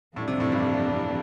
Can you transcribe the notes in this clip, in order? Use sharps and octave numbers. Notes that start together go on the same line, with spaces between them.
F2 A2 E3 G3 A#3 D4
C3
A2
G2